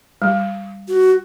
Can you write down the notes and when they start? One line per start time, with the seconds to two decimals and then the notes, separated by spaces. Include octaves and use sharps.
0.22 G3
0.88 F#4